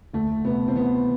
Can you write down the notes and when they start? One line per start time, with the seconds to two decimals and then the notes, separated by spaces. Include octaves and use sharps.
0.14 D2 A3
0.45 C3 B3
0.68 C4
0.75 E3 B3